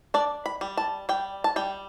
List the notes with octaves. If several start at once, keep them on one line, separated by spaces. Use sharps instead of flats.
D4 D5
B5
G3
A5
G3 G5
A5
G3 G5